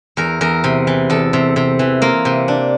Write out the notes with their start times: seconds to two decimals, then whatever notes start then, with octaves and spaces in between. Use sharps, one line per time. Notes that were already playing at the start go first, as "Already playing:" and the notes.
0.17 E2 A#4
0.41 E2 A#4
0.64 C3
0.87 E3
1.10 E2 A4
1.33 C3
1.56 C3
1.79 E3
2.02 A#3 F4
2.25 C3
2.48 D4